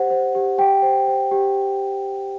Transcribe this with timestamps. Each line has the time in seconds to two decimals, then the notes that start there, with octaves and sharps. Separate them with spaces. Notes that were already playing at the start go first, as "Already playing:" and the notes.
Already playing: G4 C5 F#5
0.10 C5
0.35 G4
0.58 G4 G5
0.82 C5
1.08 C5
1.32 G4